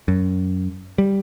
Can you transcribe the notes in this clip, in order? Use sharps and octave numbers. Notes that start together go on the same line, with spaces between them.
F#2
G3